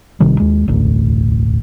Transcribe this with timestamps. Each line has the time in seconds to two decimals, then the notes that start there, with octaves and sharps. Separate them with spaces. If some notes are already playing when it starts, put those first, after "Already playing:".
0.20 G#1 C3 D#3 G3
0.40 D#2 G#3
0.68 E1 A1 D2 A2